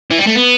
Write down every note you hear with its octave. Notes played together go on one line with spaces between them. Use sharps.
E3
G3
A3
B3